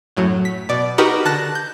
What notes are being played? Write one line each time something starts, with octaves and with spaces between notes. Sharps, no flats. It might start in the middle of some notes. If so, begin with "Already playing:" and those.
F#2 A2 F#3
B6
B2 D5
D#4 F#4 G4 A#4 B4 D#5
D3 A5 F#6 A#6
G6